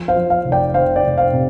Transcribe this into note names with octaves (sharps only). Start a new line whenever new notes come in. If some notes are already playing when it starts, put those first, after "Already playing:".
Already playing: F3
C5 F5
F3
C5 F5
F1
D5 G5
F1 C5 F5
D5 G5
F1
C5 F5
C3